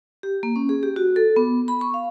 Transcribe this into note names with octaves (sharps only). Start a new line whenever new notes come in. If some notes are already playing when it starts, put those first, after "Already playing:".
G4
A#3
C#4
G#4
G4
F#4
A4
B3
B5
C#6
F5